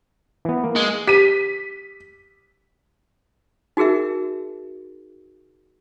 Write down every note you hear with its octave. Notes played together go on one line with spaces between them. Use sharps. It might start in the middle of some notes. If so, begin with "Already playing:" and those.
E3 B3
A#3
G#3
G4 B6 D#7
D#4 F#4 G#4 A#4 E5